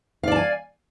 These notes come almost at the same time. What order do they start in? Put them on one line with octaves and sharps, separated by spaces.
F5 D5 A5 G#5